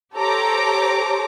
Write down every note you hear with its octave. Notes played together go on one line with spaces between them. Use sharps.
G4 A4 C5 C#5 A#5 D6